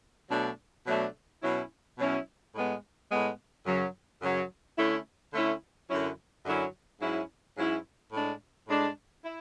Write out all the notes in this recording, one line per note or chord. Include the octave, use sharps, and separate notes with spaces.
B2 F#3 A3 D4
B2 F#3 A3 D4
B2 F#3 C#4 E4
B2 F#3 C#4 E4
A2 G#3 B3
A2 G#3 B3
F#2 C#3 F#3
F#2 C#3 F#3
D3 A3 C#4 E4
D3 A3 C#4 E4
F#2 D3 F#3 C#4 E4
F#2 D3 F#3 C#4 E4
G#2 F#3 C#4 E4
G#2 F#3 C#4 E4
A2 G#3 D4
A2 G#3 D4
E4